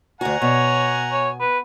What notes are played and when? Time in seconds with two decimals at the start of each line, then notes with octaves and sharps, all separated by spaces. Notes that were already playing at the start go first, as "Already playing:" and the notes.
0.21 D2 F#4 F#5 G#5 A#5
0.42 B2 C#5
1.12 C#5
1.40 B4